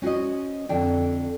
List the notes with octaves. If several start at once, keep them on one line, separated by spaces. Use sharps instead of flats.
C#4 F#4 C5 D#5
F2 D3 D4 G5